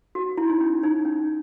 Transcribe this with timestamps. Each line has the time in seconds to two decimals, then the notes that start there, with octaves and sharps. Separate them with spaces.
0.15 F#4
0.37 E4
0.49 D#4
0.60 C#4
0.83 D#4
1.05 C#4